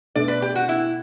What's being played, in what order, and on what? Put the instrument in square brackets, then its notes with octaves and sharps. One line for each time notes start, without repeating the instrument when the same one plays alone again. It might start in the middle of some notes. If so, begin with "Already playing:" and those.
[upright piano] B2 A3 D4 [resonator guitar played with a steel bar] D5
[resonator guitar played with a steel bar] B4
G4
F#4
E4